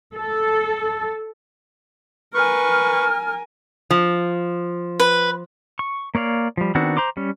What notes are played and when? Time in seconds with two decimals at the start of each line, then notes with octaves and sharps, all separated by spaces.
0.13 A4
2.34 A#4 B4 G#5 C#6 F6
3.91 F3
5.00 B4
5.79 C#6
6.15 A#3 C#5 D5 F5
6.57 F3 G3
6.75 D#3 B3 C4 D4 F#4
6.97 C5 A#5 C6 D6
7.17 G3 C#4